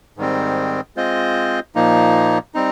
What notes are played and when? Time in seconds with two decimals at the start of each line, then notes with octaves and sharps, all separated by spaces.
0.17 G#2 D#3 G3 C4
0.96 G#3 C4 F4 C5 D#5
1.75 A#2 F3 A#3 D#4
2.54 G3 C4 D#4